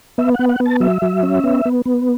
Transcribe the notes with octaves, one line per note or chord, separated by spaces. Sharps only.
B3 E5
B3 F#5
F#5
B3
A5
F#3 E5
F#3
C#4
B3
B3
B3